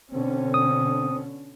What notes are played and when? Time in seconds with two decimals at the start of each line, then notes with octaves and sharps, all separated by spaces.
0.12 B2 D3 C4 C#4
0.54 D#6